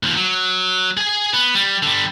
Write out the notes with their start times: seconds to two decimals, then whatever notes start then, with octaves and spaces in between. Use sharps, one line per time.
0.03 D#2 F3
0.16 F#3
0.97 G#4 G#5
1.33 B3
1.55 G3
1.83 D3 G3